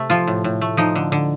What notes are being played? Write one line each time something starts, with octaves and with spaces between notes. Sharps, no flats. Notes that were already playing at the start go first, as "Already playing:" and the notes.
Already playing: C3 A3
F3 F4
A2
A2
A3
F3 D#4
D3
D3